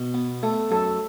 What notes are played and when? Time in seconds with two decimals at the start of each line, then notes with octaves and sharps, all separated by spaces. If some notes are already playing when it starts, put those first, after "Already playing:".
Already playing: B2
0.14 B3
0.43 A3 A4
0.71 F#2 A4